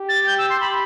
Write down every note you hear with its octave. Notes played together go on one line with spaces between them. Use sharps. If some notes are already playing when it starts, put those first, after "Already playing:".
Already playing: G4
A6
G6
E6
C6
B5